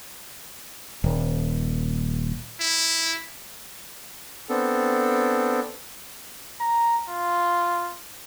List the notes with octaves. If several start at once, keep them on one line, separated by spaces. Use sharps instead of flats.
D#1
E4
B3 C4 D4 A4
A#5
F4